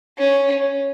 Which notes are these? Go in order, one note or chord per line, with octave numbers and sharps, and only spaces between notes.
C#4